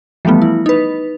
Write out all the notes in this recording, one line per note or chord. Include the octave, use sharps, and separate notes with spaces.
E3 F3 G3 A3 B3
E4
D#4 B4